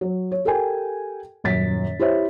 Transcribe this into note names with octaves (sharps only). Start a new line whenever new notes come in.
F#3
C#5
G4 A4 A#4 G5 G#5
D#1 F#2 A6 B6
E4 G4 C5 C#5 E5